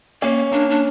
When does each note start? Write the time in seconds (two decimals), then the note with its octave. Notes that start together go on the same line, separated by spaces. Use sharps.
0.22 A#3 C#4
0.52 A#3 D4
0.70 D4